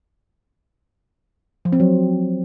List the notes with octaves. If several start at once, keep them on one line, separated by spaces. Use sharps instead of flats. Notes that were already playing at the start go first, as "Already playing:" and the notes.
F3
C4
F#3